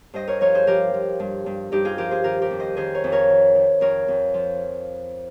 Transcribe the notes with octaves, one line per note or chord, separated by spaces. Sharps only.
G2 C5 D#5
A#4 C#5
F3 A#4 C#5
G#4 C5
F3 G4 A#4
F3
G2
G2
G2 D#4 G4
F4 G#4
F3 G4 A#4
G#4 C5
D#3 G4 A#4
G4 A#4
F2
C5 D#5
D#3 G#4 C5
A#4 C#5
F2
A#4 C#5
D#3
D#3
F2 A#4 C#5
F2
F3